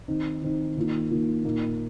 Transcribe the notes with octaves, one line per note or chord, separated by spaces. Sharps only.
D#3 C4 D#4
D#3 C4 D#4
D#3 A#3 F4
D#3 A#3 F4
A#2 A#3 D#4